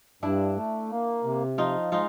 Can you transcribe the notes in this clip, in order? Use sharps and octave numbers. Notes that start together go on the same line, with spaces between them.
G2 D4 E4
A3
A#3
C3
F3 D#4 F4
G#3 D#4 F4